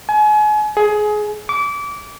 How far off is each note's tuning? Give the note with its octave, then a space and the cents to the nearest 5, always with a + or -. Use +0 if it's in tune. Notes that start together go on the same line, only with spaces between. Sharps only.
G#5 +35
G#4 +20
D6 -25